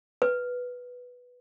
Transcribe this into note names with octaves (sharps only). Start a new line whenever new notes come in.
B4